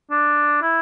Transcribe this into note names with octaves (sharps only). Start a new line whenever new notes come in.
D4
E4